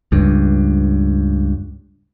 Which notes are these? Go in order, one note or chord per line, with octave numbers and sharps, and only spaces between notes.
C#2 G2